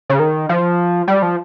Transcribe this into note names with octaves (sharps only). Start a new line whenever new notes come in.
C#3
D#3
F3
G3
F3